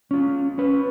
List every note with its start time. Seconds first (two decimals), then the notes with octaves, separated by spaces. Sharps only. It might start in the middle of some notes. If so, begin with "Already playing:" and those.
0.11 C#4 F4
0.58 C#4 B4